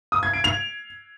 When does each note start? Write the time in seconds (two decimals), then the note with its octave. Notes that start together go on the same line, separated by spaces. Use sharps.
0.12 D#6
0.23 G#6
0.33 D7
0.44 F7